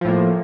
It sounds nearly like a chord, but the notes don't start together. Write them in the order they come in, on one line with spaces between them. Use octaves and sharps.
F3 A2 A#3